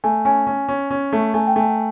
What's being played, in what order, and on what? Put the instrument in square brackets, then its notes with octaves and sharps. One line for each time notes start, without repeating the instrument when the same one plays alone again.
[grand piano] A3 [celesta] G#5
[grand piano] C#4 [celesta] G#5
[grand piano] C#4
C#4
C#4
A3
[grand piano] A3 [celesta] G#5
[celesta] G5
[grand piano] A3 [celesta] G#5